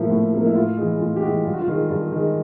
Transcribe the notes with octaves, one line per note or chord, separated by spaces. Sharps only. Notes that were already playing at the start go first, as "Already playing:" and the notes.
Already playing: A2 F3 A#3 E4
A2
F3 A#3
E4
A2 F4
E3 G#3
A2 F4
G4
E3 G#3 F#4
G2 F4
F#4
F4
D#3 G#3
G2 F4
D#3 G#3